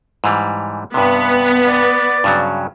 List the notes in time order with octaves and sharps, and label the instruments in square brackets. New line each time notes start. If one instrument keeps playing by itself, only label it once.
[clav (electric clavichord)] G#2 E3 G3
[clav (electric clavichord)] G2 C3 [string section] B3
[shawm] D5
[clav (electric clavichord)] G2 C#3 F#3